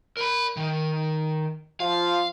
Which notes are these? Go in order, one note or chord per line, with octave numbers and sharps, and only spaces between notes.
A#4 B5
D#3
F3 F4 F5